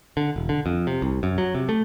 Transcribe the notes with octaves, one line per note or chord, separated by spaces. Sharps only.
D3
E1
D3
F2
C3
C2
F#2
F#3
C3
A3